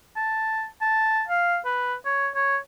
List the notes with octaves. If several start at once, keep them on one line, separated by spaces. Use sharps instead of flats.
A5
A5
F5
B4
C#5
C#5